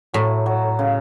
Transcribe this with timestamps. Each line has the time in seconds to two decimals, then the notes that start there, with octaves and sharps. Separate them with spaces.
0.14 A2 F#3
0.46 F#3
0.79 C#3